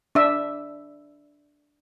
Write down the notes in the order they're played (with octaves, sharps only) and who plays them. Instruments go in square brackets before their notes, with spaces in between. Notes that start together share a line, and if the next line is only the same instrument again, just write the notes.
[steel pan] D4 E5